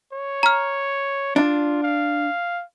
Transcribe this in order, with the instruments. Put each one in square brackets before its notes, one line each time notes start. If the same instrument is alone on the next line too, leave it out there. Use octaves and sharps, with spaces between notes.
[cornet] C#5
[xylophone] A#5 F6
[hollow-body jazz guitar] D4 [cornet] F4
[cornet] F5